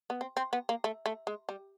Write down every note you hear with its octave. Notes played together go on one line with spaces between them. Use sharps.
B3
C4
C4
B3
A#3
A3
A3
G#3
G3